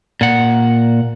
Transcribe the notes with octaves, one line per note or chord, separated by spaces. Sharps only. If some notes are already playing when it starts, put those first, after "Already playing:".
A#2 F#5